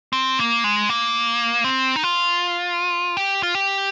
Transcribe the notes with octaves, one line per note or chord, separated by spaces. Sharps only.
C4
A#3
G#3
A#3
C4
D#4
F4
G4
F4
G4